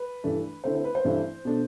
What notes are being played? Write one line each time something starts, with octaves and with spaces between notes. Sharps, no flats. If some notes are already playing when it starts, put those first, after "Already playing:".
Already playing: B4
G2 E3 A3 D4
D3 A3 C4 E4 C5
C5
B4
C5
G2 E3 A3 C4 E4
B2 A3 D4